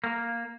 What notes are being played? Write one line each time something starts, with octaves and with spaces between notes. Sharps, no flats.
A#3